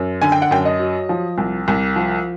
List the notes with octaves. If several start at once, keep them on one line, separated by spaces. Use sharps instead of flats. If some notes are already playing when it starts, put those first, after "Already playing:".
Already playing: F#2
D3 G#5
G5
F#5
F#2 G5
D#5
F#3
F3
C2
C2
F3